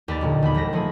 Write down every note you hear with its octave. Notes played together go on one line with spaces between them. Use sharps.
D#2 B4 D5 A6
B1 A#2 D3
D#2 B3 B5
E1 G3 B4 A#6
F3 A3 A#3 G#4 B5